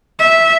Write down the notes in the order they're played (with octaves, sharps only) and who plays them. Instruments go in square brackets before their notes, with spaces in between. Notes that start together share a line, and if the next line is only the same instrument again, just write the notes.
[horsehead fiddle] E5